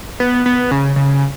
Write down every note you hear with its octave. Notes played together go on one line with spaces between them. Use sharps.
B3
B3
C#3
C#3